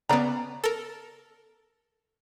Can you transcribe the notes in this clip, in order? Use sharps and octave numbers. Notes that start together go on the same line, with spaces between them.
C#3 B3 D5 A#5
A4 A#4